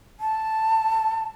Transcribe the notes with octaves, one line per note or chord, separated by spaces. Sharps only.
A5